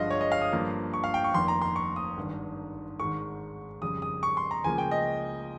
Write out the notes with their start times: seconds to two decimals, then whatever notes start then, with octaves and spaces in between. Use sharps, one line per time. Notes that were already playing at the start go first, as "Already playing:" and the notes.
Already playing: G1 G2 F3 G#3 D#5 F5
0.11 C#5
0.21 D#5
0.32 F5
0.42 D#6
0.52 G2 F3 A#3
0.94 C#6
1.04 F5
1.14 G5
1.24 C#6
1.34 F1 F2 D#3 A#3 C6
1.48 A#5
1.62 C6
1.76 C#6
1.96 D#6
2.17 G#1 G2 D#3
2.99 G#1 G#2 D#3 G#3 C#6
3.82 F2 C#3 G3 D#6
4.02 D#6
4.23 C#6
4.37 C6
4.51 A#5
4.64 C#2 C#3 F3 A#3 G#5
4.78 G5
4.91 D#5